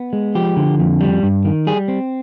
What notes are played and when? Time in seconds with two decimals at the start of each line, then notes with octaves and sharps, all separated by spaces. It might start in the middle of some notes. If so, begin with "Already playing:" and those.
Already playing: B3
0.13 G#3
0.35 F3 G4
0.57 D3
0.79 F2
1.01 G3
1.23 G2
1.45 D#3
1.67 G3 G#4
1.88 C4